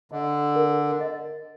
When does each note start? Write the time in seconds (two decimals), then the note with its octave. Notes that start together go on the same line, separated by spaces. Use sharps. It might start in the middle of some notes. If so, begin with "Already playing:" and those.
0.12 D3 D#5
0.56 A#4
1.01 D#5